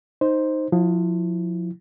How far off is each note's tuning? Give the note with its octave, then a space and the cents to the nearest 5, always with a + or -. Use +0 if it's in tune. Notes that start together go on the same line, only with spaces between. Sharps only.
D#4 +0 C5 +0
F3 +30 E4 +0